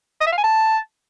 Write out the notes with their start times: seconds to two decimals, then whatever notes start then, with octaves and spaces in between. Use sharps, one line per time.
0.21 D#5
0.27 E5
0.32 F5
0.38 G#5
0.44 A5